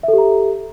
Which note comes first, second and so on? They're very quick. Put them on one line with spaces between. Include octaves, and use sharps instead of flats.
E5 A4 G4 A#5